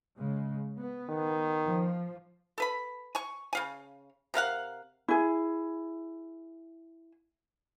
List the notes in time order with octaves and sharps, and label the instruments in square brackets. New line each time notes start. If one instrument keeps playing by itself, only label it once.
[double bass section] C#3 G#3
B3
[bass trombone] D#3
[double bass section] F3
[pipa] A4 B4 B5
G#5 C#6
C#3 F5 G#5
C3 A#4 F5 F#5
[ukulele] E4 G#4